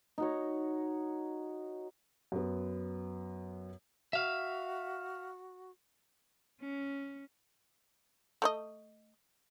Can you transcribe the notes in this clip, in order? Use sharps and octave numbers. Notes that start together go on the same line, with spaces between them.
D#4 F#4 C#5
F#2 B3
F#4 E5 F5
C#4
A3 D5 D#5